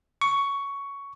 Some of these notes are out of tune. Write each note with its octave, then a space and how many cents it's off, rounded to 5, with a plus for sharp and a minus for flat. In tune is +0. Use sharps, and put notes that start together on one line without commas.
C#6 +10